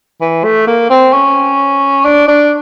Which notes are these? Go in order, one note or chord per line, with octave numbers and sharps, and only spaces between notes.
E3
A3
A#3
C4
C#4
D4
D4